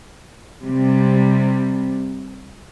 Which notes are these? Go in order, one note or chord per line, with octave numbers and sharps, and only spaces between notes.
C3 G3